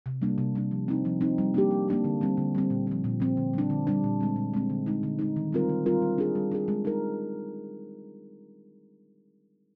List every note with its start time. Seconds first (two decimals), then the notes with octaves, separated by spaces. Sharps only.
0.06 C3
0.22 G3 A#3 D4
0.38 C3
0.55 G3 A#3 D4
0.71 F3
0.88 C4 D#4
1.05 F3
1.21 C4 D#4
1.38 G3
1.54 A#3 D4 G4
1.71 G3
1.88 A#3 D4 G4
2.04 D3
2.21 G3 C4
2.37 D3
2.55 G3 C4
2.70 A#2
2.87 F3 C4
3.04 A#2
3.20 F3 C4
3.37 D3
3.53 G3 D4
3.70 D3
3.87 G3 D4
4.04 A#2
4.20 G#3 C4
4.36 A#2
4.54 G#3 C4
4.70 D3
4.86 G#3 D#4
5.03 D3
5.19 G#3 D#4
5.36 D#3
5.52 G3 C4 F4 A#4
5.69 D#3
5.86 G3 C4 F4 A#4
6.02 G3
6.18 D4 G#4
6.35 G3
6.52 D4 G#4
6.68 G#3
6.85 D#4 A#4